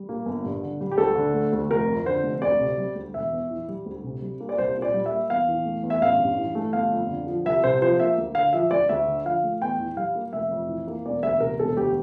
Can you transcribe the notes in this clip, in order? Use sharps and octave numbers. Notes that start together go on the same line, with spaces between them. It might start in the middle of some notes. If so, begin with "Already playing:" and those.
Already playing: G3
A#3
G1
G2
D3
G3
G4
D2 A4
D3
A3
D2
F1 A#4
F2
D3 C5
F1
D2 D5
C3
G3
D2
E1 E5
E2
E3
G3
D2
C3
G3
A#3
D5
C2 C5
A#2
D5
G3
E5
A#3
E2 F5
E3
A3
E2
E5
A1 F5
G2
E3
A3
G1 F5
F2
D3
F3
C2 E5
C3 C5
F3 C5
A#3 E5
D2
D3 F5
F3 E5
D2 D5
D2 E5
D3
F3 F5
A3
E2 G5
E3
G3 F5
A#3
F1 E5
F2
E3
A#3
E1 D5
D2 E5
C3 A#4
E1 A4
D2 G4